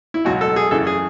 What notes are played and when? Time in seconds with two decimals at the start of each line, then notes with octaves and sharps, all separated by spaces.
0.14 E4
0.25 C#2 B2 F#3 F#4
0.41 A4
0.56 G#4
0.71 F#2 C#3 E3 A4
0.87 G#4